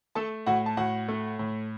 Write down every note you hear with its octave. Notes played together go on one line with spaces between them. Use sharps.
A3 A4 A5
A2 F#4 F#5
A5
A2 F#4 F#5
A3
A2